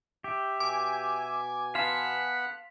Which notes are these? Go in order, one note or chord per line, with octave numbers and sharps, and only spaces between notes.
G4 E5
B2 G#5 D6
B3 F5 F#5 A5 C6 F#6 B6